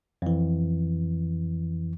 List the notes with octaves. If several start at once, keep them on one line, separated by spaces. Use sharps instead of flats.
F2 E3